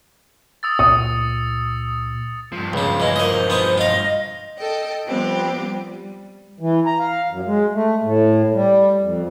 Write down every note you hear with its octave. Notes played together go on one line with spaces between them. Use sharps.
D#6 E6 A6
C#2 A#2 D#6 C#7
G2 F3
C#2 C#3
E3 C#4 D#5
A#3 C5 D#5
B3 D#4 G#4
F4 D#5 F5
A4 D#5 G5
F3 G3 B3 C4 G4
G3
E3
A#5
F5
F#2
G#3
A3
A2
G3
F2